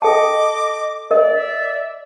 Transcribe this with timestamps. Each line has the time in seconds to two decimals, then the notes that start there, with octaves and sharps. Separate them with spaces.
0.02 A4 D#5 G5 A5 D6
1.11 A#4 D5 D#5
1.33 E5